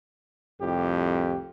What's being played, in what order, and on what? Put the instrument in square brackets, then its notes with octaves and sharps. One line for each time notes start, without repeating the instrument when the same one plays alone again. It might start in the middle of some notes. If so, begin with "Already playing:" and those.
[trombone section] C2 A2 G4 [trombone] F2